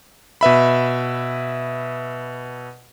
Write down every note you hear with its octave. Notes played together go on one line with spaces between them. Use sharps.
B2 B4 E5 B5